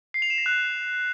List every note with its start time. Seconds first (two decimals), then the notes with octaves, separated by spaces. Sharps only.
0.14 C7
0.22 F7
0.30 E7
0.38 A#6
0.46 F#6